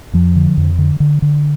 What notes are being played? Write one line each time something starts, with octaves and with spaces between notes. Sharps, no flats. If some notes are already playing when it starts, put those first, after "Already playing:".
F2 F3
D3
F2
D3
D3
D3